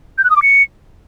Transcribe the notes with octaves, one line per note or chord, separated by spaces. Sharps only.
G6
F#6
D#6
D6
C#7